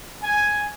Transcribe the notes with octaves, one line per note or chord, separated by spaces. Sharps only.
G#5